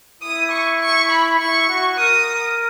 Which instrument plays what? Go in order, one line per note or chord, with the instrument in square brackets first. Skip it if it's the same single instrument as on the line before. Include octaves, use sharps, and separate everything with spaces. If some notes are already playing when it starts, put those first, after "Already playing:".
[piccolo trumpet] E4 [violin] D#6
[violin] C#6
C#6
B5
[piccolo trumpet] E4 [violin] C#6
[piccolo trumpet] F#4
[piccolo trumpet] A#4 [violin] D#6